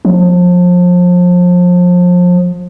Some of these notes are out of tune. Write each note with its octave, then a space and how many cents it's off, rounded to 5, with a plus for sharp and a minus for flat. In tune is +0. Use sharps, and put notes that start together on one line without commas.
F3 +30